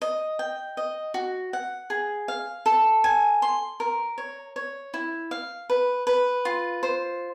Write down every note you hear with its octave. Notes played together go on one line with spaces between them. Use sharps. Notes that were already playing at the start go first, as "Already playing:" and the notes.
D#5
G5
D#5
F#4
F#5
G#4
F5
A4
G#5
C6
A#4
C#5
C#5
E4
F5
B4
B4
F4
C5